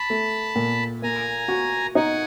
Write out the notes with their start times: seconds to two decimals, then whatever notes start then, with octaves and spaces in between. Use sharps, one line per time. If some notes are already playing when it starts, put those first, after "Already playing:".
Already playing: A5 B5
0.10 A3
0.56 A#2
1.02 A#3 G#5 A#5
1.48 F#4
1.95 D#4 F#5 G#5